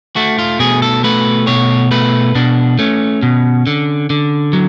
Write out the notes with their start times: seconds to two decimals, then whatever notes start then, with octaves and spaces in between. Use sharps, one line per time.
0.16 A3 F#4
0.39 F4
0.59 B2 G#4
0.82 A4
1.04 A3 B4
1.47 B2 C#5
1.91 A3 B4
2.35 B2 D4
2.79 A3 C#4
3.23 B2
3.67 D3
4.10 D3
4.53 F#3